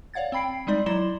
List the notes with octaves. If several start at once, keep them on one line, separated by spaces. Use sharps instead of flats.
C#5 D5 F5 F#5 G#6 A6
C4 G5 B5 C7 D7
G3 G#3 D#4 D5
F#3 E4 D5 C6 E7 G7